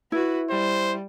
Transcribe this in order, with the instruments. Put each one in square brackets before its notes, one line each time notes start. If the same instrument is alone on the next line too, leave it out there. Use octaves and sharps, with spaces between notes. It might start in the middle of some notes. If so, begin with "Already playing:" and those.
[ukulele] E4 [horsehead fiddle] F#4 B4
[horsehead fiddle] G3 [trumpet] C5